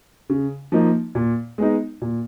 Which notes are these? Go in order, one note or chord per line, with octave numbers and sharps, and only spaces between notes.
C#3
F3 A#3 D#4
A#2
G#3 B3 D#4
A#2